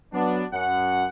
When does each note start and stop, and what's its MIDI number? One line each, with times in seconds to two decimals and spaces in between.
0.13 0.43 54
0.13 0.43 59
0.13 0.43 62
0.53 1.06 42
0.53 1.06 78